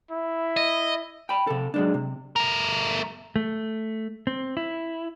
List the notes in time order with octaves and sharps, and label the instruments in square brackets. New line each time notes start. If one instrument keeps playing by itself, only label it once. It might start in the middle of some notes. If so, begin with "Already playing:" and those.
[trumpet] E4
[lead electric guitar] D#5
[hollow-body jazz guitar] G5 B5
C3 A4
F#3 G#3 D4
C3
[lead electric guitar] A3 A#4
[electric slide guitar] A3
C4
E4